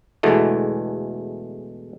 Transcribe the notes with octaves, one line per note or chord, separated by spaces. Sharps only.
E2 B2 D3 E3 G#3 A3